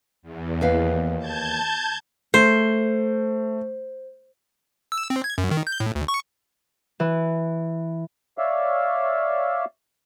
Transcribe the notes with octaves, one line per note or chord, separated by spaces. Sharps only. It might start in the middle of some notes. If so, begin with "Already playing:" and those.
E2
D#2 B4 F5
A5 G6 G#6
A3 C5
E6
C4
G#6
F#2
D#3
G6
A2
D2
C#6
E3
C#5 D5 E5 F5